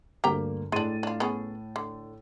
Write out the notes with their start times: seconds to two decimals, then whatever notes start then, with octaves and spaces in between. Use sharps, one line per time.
0.24 D2 G2 A#3 G4 G5 A#5
0.72 A2 G#3 D4 A6 D#7
1.03 D4 F4
1.20 B3 C#4 G#4
1.76 D3